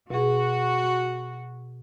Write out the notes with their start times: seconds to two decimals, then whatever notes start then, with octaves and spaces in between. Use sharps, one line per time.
0.10 B2 F#4 G#4